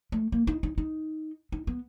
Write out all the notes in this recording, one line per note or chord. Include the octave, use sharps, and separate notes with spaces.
A3
A#3
D#4
D#4
D#4
D#4
B3